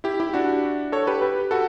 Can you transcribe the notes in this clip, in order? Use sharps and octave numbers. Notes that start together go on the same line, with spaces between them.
E4 G4
E4 G4
D4 F#4
A4 C#5
G4 B4
G4 B4
F#4 A4